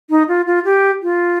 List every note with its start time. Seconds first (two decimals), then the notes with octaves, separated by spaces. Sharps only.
0.10 D#4
0.29 F4
0.47 F4
0.65 G4
1.03 F4